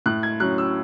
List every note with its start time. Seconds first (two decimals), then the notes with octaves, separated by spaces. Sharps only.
0.06 A2 F#6
0.23 G#6
0.40 F#3 C#4 F#6
0.58 E6